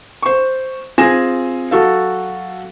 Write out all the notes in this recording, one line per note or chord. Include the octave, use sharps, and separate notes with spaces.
C5 C#6
C4 F4 G#4 G#5 A#6 E7
F#3 F#4 A4 F5